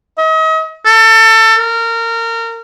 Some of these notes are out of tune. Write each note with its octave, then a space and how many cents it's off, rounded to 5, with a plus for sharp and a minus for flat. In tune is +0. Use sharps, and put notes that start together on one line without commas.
D#5 +40
A4 +25
A#4 -25